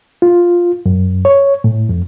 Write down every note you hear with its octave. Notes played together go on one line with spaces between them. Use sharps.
F4
F#2
C#5
A2
F2